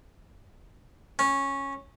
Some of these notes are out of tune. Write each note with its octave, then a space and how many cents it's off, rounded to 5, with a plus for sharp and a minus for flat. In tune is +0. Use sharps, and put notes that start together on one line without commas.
C#4 -10